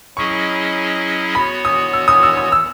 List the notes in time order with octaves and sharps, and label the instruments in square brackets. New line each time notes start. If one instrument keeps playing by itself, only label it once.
[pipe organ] F#3 C#4 E4 G#4 D#5 [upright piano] C#6
[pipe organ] B3 F#4 C#5 [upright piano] B5
[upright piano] D#6
E6
D#6
E6
D#6
E6